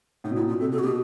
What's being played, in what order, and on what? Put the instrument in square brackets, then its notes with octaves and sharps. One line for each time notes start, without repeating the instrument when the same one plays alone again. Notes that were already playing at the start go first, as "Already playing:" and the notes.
[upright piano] A2 [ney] D#4
[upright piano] B2
[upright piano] A#2 [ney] E4
[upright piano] B2 [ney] F4
[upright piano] C3 [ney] A4
[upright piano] B2 [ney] A4
[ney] F#4
[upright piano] B2 [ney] G4